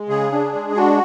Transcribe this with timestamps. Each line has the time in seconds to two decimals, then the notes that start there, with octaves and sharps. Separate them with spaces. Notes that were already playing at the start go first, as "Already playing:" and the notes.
Already playing: G#3
0.08 C#3 G#4
0.32 D4
0.53 G#3
0.76 D4 F#4